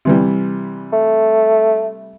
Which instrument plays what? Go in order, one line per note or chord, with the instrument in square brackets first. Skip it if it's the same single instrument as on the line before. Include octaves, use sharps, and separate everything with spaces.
[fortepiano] C3 E3 G3
[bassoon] A3